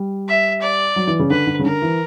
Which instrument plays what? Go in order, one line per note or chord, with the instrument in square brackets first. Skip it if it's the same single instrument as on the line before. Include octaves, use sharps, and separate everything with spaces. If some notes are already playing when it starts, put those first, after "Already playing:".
Already playing: [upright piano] G3
[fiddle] E5
D5
[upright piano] F#3
E3
C#3
[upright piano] D3 [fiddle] B4
[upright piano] D3
C#3
[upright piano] D3 [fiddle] A#4
[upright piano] E3